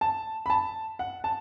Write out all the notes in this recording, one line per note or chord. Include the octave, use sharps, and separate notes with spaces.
A5
B5
A5
F#5
A5